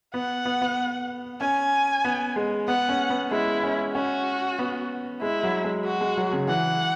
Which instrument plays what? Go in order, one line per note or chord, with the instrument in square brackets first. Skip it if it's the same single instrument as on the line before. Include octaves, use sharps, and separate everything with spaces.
[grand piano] B3 [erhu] F#5
[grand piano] B3
B3
[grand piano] C#4 [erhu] G#5
[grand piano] B3
G#3
[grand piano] B3 [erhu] F#5
[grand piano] C#4
B3
[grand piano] G#3 [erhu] E4
[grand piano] C#4
[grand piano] C#4 [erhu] F#4
[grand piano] B3
[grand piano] G#3 [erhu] E4
[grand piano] F#3
G#3
[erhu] F#4
[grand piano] G#3
F#3
C#3
[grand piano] E3 [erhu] F#5